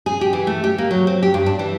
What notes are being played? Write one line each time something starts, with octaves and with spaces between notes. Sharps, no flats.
G#4
G4
E3
A3
G4
A#3
F#3
C4
G4
G2
D4
E3